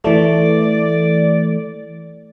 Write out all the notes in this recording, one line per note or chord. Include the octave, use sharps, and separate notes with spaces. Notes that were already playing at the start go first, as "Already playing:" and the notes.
E3 A3 D5